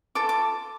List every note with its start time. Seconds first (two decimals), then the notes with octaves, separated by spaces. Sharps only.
0.15 F4 A4 D6
0.29 D6